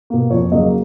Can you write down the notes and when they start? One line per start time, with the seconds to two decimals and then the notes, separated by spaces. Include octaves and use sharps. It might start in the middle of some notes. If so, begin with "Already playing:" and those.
0.10 B2 A#3
0.30 F2 C#5
0.52 C#3 F#3 A#3 D#5